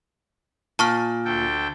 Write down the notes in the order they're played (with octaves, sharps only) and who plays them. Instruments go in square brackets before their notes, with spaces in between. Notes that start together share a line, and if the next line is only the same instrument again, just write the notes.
[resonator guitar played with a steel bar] A#2 [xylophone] A5 C#6 F6
[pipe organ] D2 A4 G5